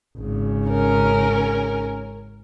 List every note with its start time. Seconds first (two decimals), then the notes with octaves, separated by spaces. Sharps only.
0.17 G#1 C#3
0.69 C#4 A#4